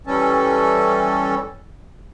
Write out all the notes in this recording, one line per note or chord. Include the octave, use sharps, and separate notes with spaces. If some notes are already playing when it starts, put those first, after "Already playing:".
E3 G3 C#4 A4